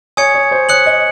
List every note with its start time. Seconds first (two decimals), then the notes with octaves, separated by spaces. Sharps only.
0.17 C#5 G#5 D#6 G#6 C#7
0.34 C#5
0.51 C5
0.69 C#5 D#6 F#6 C#7 F#7
0.86 D#5